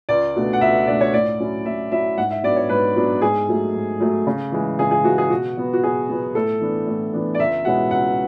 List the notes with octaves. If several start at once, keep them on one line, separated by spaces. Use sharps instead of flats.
C#2 D5
B2 A3 D4
F#5
C#2 E5
B2 A3 D4 D5
C#5
A2 D5
F#3 C#4 E4
A2 E5
F#3 C#4 E4 E5
G#2 F#5
E5
F#3 B3 D4 D5
C#5
G#2 B4
F#3 B3 D4
G#2 G#4
F#3 A3
G#2
F#3 A3
C#3
E3 G#3
C#3 G#4
G#4
E3 G#3 F#4
G#4
B2 F#4
F#3 B3
F#4
B2 G#4
F#3 B3
A2 A4
E3 B3 D4
A2
E3 B3 D4
D5
C#2 E5
B2 G#3 C#4 E4 F#5
C#2 F#5